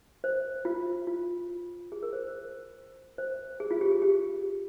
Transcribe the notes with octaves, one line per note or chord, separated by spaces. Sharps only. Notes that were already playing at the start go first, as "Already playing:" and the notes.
C5
F4
F4
G#4
A#4
C5
C5
C5
G#4
F4
G4
G#4
G4